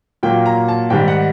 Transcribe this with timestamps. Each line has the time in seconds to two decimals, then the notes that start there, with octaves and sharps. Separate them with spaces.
0.23 A#2 F#3 A#3 G5
0.46 A#5
0.68 A5
0.90 G#2 D#3 G3 G5
1.08 F#5